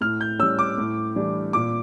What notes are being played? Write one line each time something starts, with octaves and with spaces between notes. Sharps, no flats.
A2 F6
G6
G3 C#4 E6
D6
A2
E3 G3 D4
A#2 D6